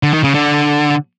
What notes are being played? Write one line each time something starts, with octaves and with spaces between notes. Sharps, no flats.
D3
D#3
C#3
D3